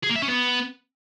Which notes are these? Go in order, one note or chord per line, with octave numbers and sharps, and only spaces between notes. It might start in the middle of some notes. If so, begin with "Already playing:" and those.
G#4
A#3
E5
C#4
B3